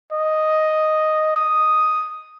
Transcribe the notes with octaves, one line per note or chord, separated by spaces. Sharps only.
D#5
D#6